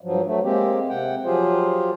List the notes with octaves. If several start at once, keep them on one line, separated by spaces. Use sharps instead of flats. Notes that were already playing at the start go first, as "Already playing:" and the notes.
G2 F3 F#3
F#3 A3
G#3 A#3 C4 G4
C3 F#5 G5
F3 F#3 F4 G4 G#4 C5